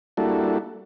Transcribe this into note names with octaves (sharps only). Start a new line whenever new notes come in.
G3 A#3 D4 E4 F#4 A4